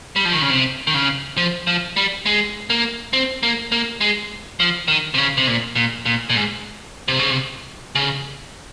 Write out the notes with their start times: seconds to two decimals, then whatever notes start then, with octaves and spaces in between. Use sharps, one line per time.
0.16 G3
0.25 F3
0.33 D#3
0.42 C#3
0.50 C3
0.87 D#3
0.94 C#3
1.37 F3
1.67 F3
1.96 G3
2.26 G#3
2.70 A#3
3.13 C4
3.43 A#3
3.72 A#3
4.01 G#3
4.60 F3
4.88 D#3
5.14 C3
5.18 C#3
5.37 C3
5.47 A#2
5.76 A#2
6.06 A#2
6.30 A#2
6.35 G#2
7.08 C3
7.19 C#3
7.30 C3
7.95 C#3